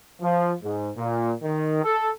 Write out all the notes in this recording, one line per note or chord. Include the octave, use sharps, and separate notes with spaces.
F3
G#2
A#2
D#3
A4